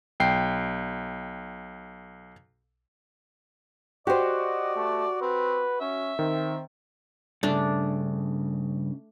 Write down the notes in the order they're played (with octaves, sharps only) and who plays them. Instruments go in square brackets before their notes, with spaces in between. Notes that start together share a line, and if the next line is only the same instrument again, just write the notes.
[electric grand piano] B1 G5 C7
[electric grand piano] F#4 [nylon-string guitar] G4 C5 [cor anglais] D5 [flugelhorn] D#5
[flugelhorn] A3
[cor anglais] C4 [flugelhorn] B4
[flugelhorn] C#4 [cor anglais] E5
[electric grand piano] D#3 [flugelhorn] C4
[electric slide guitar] G2 C#3 [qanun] A3 D4